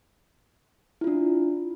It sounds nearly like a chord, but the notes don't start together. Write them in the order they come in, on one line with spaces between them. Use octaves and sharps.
E4 F4 D4